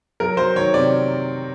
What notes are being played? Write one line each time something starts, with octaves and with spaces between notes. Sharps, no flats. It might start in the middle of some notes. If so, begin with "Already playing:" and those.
F#3 A#4
F#3 C5
D#3 C#5
C3 D5